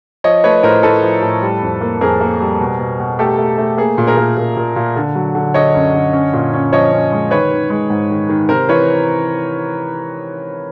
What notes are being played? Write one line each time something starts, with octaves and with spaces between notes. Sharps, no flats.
F3 C#5 D#5
A3 B4 C#5
A2 A#4 C5
A2 A4 B4
F3
A2
G3
F2
A#3
F2 G#4 A#4
A#3
G3
B2
B2
B2
A3 G4 A4
A3
A3
A#3 G#4
A#2
G#4 A#4
A#2
A#2
A#2
A#2
D3
F#3
D3
D3 C#5 D#5
F#2
D3
C#4
A#2
C#4
F3 C#5 D#5
C#4
G#3
D#3 B4 C#5
D#3
G#3
G#2
D#3
D#3
C3 A#4 C5
E3 B4 C#5